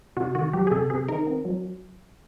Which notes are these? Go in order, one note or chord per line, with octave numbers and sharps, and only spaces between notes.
C3 F#4
D#3 F#4
F#3 G4
G#4
C3 A4
C3 G#4
D#3 A#4
C4
F#3